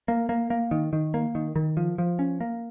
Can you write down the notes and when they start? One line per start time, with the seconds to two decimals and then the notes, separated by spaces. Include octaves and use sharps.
0.08 A#3
0.29 A#3
0.50 A#3
0.71 D#3
0.93 D#3
1.14 A#3
1.35 D#3
1.56 D#3
1.77 F3
1.98 F3
2.19 C#4
2.41 A#3